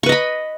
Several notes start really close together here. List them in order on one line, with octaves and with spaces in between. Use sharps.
C#6 B4 D#5 B5